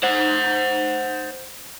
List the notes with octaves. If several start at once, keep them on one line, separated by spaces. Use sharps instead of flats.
C5 F#5